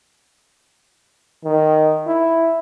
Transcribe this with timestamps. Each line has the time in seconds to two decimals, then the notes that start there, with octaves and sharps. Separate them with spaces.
1.44 D#3
2.07 E4